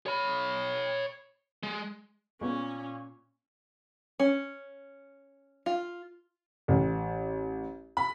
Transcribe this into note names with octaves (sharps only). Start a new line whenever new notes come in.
C#5 B5
G#3
A#2 G#3 B3 C#4 C#6
C#4
F4
A1
B5